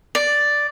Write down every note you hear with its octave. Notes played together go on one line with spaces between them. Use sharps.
D5